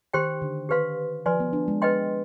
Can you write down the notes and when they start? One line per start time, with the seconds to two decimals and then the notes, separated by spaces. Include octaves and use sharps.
0.13 D#3 G4 C5 G5 C6
0.42 D3
0.69 D#3 G4 B4 F5 C6
1.26 F3 B4 D5 G#5 C6
1.40 B3
1.53 D4
1.68 G#3
1.82 B4 D#5 G5 C6